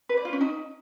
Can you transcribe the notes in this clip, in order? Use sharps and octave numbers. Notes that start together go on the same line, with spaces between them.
B4
D5
F4
C#4
D#4